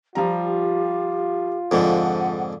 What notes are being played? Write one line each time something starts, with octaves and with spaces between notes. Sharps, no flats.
F3 G3 F4 G4 A#5
F2 G#2 D3 F3 F#5